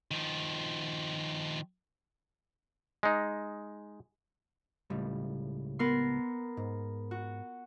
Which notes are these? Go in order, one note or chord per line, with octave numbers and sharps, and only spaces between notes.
D#3 F3
G#3 D#4
C#2 A2 G3
B3 A#4 C6
G#2
F#4